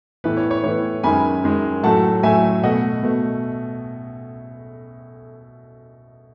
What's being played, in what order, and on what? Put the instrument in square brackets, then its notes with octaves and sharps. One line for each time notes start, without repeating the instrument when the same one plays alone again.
[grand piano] A2 E3 B3 B4
C#5
C#5
A2 E3 B3 C#5
F#2 D#3 G#3 G#5 B5
F#2 D#3 G#3
A2 F#3 A3 F#5 A5
A2 F#3 A3 E5 G#5
B2 A3 D#5 F#5
B2 A3